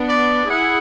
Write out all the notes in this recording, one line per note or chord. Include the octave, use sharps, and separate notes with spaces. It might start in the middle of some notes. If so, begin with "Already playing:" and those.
Already playing: B3 D4
D5
E4 G#4 F#5